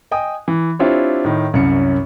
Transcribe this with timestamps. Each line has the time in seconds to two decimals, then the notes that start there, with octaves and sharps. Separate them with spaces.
0.11 D#5 G5 G#5 D#6
0.48 E3
0.79 C4 D4 E4 F4 G4 C#5
1.24 A2 D#3
1.53 C2 F#2 C#4 C#7